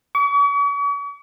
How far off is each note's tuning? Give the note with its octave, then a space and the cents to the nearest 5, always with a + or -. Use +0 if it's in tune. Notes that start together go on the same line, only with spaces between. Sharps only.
C#6 +45